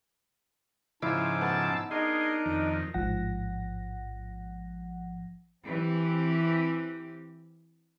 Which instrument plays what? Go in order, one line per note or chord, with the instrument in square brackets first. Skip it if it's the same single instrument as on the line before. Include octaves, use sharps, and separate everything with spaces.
[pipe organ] G#2 E6 [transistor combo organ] C#3 F3 D6 [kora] E4 [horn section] F4 A5
[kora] B3 [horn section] A5
[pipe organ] D4 A#4 [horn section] D#4 D#5 [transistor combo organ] G#4 C6
[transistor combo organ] F2 D#3
[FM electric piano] A1 G#2 F3 F#5 A#6
[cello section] E3 C4 G4